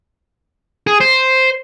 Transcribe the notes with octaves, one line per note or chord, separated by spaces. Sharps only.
G#4
C5